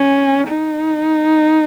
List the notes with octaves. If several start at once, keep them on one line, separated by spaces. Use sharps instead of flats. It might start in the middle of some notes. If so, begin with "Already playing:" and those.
Already playing: C#4
D#4